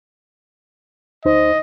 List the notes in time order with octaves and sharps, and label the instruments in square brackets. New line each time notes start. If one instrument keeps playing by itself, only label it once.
[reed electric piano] D2 D#4 C5 [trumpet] D#5